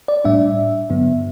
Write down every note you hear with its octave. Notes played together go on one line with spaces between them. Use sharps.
D5
A2 G3 D4 E5
G2 D3 F#3 B3